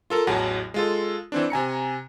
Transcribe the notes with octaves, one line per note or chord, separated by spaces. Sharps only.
F4 A4 A#4
A1 E2 F#3 F#5 A5
G#3 F4 A4
E3 C4 D4
C3 G#5 A#5 C#7